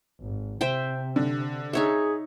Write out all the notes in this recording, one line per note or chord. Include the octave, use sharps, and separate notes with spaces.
G#1
C3 C5 E5 G5
D3
D#4 G#4 C#5 E5